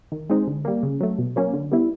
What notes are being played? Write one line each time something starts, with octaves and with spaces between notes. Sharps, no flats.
D#3
G#3 C4 D#4
D3
G3 A#3
C#3
F#3 A3
B2
F#3 A#3 C#4
D3
G3 B3 E4